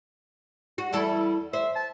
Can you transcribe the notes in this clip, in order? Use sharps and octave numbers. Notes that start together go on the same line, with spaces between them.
F#4
E2 G3 E4 A4
C5 E5
A5